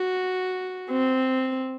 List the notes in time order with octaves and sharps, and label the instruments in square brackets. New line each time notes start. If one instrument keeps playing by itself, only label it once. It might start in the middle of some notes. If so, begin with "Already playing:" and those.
Already playing: [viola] F#4
C4